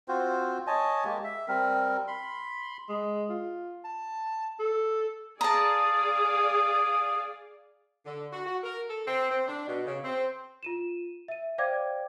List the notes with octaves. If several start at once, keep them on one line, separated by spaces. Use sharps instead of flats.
C4 F4 F#4 C5
C#5 D#5 G#5 A5
G#3 A#3 G4
E5
G3 C4 A#4
B5 C6
G#3
F4
A5
A4
G#4 D5 F5 A5 A#5 D#6
D3
F#4
F#4
A#4
A4
C4
C4
D4
B2
C#3
C4
F4 D#7 E7
E5 D#7
C5 D5 F5 G5 D6 G#6